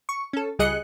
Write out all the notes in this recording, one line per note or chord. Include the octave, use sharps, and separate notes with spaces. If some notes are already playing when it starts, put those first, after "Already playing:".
C#6
C#4 A4
C#2 G3 G#4 D#5 F#6 C#7